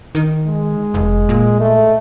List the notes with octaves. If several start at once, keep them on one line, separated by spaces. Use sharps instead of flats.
D#3
G#3
F1
A#2
A3